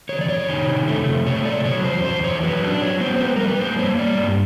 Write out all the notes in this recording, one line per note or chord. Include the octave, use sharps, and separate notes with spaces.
D#3 C#5
D5
C3 C#5
D#3
C3
A3
C3
A3 C#5
C3 D5
F#3 C#5
E2 C5
E2 C5
E2 C#5
F#3 B4
D4
F#3 C#5
B3 C5
C5
G3 B4
G3 A#4
B4
A#3 C5
A#3 C#5
G3 D5
G2